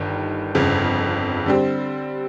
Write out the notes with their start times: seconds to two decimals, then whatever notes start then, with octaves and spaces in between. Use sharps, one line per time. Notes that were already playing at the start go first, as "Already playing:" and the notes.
Already playing: G1 G2 D#3
0.55 G1 F2 C#3
1.46 D3 G3 C4